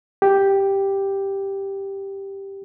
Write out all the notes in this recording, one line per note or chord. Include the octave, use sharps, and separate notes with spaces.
G4